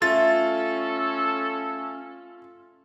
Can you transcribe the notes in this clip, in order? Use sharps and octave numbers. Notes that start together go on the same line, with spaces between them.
A3 C#4 F4 A4 A6